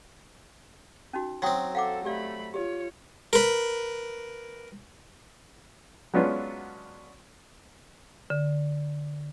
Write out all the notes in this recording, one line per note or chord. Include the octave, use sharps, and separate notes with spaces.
C#4 D#4 F#4
F#3 C4 F#4 G5 D#6
A4 F5 F#5 D6
A3 G4 D5 F5 B5
F4 G4 C#5
A#4 B4
F#3 G#3 B3 C#4 D4 F4
D3